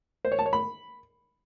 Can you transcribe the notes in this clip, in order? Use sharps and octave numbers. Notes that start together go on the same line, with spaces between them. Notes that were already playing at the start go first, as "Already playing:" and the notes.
C5
C#5
A5
C#5
B5